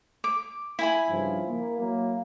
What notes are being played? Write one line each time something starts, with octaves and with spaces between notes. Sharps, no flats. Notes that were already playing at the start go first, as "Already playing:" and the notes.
D6
E4 G#5 B5
G2 C#3 F3
A#3
F#3 A#3